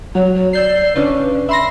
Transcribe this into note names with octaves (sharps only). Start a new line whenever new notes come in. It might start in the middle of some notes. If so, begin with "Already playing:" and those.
F#3 C#5
C#5
D5 E6 G6 C7
C#3 C#4 D4 B4
E5 B5 C6 A#6